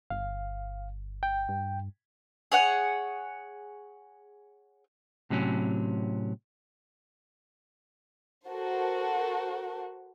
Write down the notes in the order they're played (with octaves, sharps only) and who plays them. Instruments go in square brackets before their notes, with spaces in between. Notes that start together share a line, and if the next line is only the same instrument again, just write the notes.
[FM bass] G1 [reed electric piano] F5
[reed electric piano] G5
[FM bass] G2
[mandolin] G#4 C#5 F#5
[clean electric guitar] A2 C3 F#3 C#4
[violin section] F#4 A4 A#4 C5